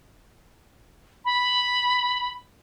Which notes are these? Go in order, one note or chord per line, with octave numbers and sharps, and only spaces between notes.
B5